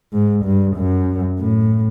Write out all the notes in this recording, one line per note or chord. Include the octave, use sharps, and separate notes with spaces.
G#2
G2
F#2
A2